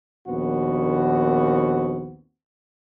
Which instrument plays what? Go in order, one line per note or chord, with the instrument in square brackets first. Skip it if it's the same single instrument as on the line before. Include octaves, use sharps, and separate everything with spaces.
[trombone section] A#1 D#2 B3 C4 F#4